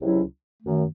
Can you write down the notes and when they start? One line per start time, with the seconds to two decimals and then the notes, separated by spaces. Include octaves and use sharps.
0.01 C#2 C3 F#3 C#4 E4
0.63 F#2 D#3 A3